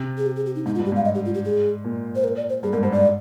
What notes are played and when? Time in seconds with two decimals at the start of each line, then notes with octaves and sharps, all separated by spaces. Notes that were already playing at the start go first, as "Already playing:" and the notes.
Already playing: C3
0.18 G#4
0.26 G4
0.36 G#4
0.46 G4
0.56 D#4
0.66 G#2 D#4
0.75 F4
0.79 G2
0.85 G4
0.92 G#2 F5
1.05 D#5
1.15 G4
1.25 F4
1.34 G4
1.45 G#4
1.84 A#2
2.15 C5
2.24 A#4
2.37 D5
2.49 C5
2.63 G2 G#4
2.73 G#2 A#4
2.83 G2 C5
2.92 G#2 D5